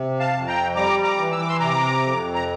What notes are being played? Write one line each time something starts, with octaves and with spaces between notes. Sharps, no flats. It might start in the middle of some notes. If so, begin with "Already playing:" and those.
Already playing: C3
F5 A5
F2
G5 A#5
G3 A#5 D6
A#5 D6
E3
E6
D6
C6 E6
C3 A#5 D6
F2
A#5